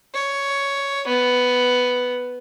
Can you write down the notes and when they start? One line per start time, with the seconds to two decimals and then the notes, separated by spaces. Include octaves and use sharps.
0.14 C#5
1.07 B3